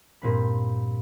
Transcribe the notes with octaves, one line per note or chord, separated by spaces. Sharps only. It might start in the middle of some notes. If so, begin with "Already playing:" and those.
G2 A#2 C4 B5